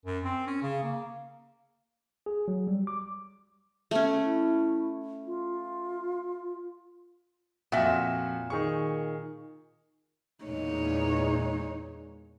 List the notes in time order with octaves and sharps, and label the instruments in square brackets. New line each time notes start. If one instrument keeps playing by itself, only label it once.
[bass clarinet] F#2
C4
C#4
C#3
A#3
[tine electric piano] G#4
F#3
G3
D6
[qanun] A3 C#4
[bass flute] E4
F4
[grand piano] F2 F#4 [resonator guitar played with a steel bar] A#2 E5
[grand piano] D#3 G#4 C#6
[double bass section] E2 A#2 G#3 [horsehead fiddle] D#4 C#5